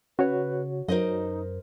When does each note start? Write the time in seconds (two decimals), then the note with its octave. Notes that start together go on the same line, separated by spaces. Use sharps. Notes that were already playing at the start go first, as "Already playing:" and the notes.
0.19 C#3 F#4 B4 C#5
0.88 F#2 D#4 A#4 C5 D#5